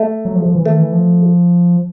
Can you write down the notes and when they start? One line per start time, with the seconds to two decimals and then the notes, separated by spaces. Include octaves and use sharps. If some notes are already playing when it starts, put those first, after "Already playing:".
Already playing: A3
0.25 F#3
0.35 F3
0.46 F3
0.55 E3
0.65 D#3 A3
0.78 E3
0.92 F3